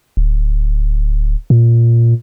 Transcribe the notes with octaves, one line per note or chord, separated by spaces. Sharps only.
D1
A#2